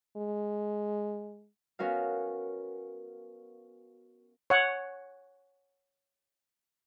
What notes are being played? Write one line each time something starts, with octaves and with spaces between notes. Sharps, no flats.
G#3
B3 C#4 F#4 A#4 F5
C#5 F#5